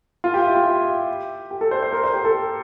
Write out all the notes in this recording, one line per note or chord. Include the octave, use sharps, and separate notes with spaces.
F4
G4
E4
F4
G4
G4
A4
C5
C5
A#4
C5
G4
A4